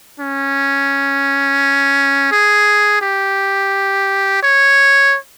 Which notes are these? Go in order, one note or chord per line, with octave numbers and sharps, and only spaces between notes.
C#4
G#4
G4
C#5